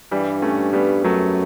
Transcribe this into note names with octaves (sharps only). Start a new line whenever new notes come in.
G2 E3 G3
A3 C#4
G3 B3
F#2 F#3 A3